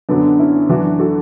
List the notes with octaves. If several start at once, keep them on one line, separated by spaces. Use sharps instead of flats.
F#2 D3 F#3 B3 D4
C#4 E4
F#2 E3 D4 F#4
F#4 A4